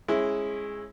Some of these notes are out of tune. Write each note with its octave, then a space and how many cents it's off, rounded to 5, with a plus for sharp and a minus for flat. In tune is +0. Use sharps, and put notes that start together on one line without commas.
G#3 +0 C#4 -30 E4 +0